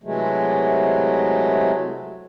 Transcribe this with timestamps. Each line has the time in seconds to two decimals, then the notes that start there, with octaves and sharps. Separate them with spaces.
0.04 C3 E3 F#3 G#3 A3